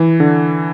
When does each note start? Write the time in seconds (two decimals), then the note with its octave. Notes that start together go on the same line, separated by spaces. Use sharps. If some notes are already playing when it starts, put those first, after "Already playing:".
Already playing: E3
0.20 D3